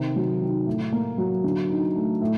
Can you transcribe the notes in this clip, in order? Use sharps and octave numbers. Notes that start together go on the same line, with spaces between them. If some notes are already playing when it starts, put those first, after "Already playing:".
Already playing: C3 D#3
F#3
D#3
A2
A#3
F#3
D3
D#4
A3
A2